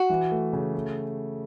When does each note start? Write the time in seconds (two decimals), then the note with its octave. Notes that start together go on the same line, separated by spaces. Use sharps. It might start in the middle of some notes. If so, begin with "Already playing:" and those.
Already playing: F#4
0.10 E3
0.31 A3
0.53 C#3
0.75 A3